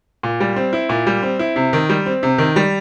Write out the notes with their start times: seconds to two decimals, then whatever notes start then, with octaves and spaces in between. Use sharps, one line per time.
0.23 A#2
0.40 G3
0.56 C4
0.73 E4
0.89 A#2
1.07 G3
1.23 C4
1.39 E4
1.56 C3
1.73 D#3
1.89 G3
2.06 C4
2.23 C3
2.38 D#3
2.56 G3